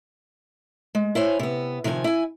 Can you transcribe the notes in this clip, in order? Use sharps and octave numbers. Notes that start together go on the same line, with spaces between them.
G#3
E4 C5 C#5 G#5
C3 B3
C3 D#3 F3 B4 G#5
E4 G#5